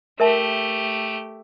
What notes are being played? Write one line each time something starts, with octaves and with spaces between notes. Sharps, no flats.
A3 G4 A#4 E5 A5